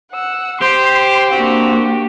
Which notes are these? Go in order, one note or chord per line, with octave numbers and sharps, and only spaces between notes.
F#5 E6
G4 C5 C6
A#3 C4 D4 F#4